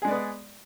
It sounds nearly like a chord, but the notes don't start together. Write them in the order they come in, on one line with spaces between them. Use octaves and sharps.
G#4 G#3 D5 B3